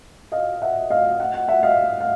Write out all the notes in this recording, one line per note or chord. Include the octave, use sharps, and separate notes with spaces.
D#5 F5
E5 F#5
D#5 F5
F#5
F#5
E5 F#5
D#5 F5
F5